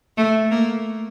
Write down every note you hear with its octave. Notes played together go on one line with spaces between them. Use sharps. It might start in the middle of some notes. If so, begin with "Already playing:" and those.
A3
A#3